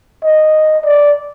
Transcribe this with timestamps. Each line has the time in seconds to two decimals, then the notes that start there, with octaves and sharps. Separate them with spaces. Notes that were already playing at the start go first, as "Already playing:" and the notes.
0.24 D#5
0.85 D5